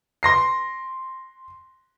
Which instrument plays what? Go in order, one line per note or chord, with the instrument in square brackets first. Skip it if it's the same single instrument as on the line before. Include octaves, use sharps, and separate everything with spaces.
[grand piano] C6 A#6 C7